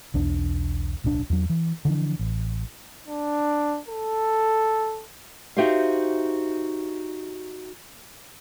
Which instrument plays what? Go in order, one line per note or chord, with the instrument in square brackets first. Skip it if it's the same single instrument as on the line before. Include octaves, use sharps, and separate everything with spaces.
[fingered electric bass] B1 E2 D4
D1 B1 C#3 D4
E2 F#3
E3
D3 E3 F3 D4
A1
[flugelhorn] D4
A4
[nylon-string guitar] D#4 F#4 G4 C5 E5 F5